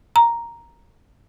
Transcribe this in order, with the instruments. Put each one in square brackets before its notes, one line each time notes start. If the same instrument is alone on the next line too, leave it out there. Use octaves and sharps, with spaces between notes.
[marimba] A#5